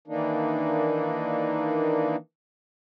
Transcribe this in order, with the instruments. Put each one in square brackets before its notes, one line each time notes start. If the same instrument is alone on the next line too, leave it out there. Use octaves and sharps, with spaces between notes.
[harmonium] D#3 E3 A#3 D4 D#4